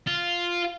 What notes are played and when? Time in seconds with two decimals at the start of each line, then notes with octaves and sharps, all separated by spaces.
0.07 F4